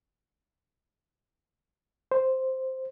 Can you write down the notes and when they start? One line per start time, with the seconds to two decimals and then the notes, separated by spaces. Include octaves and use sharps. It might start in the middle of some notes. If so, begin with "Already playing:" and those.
2.12 C5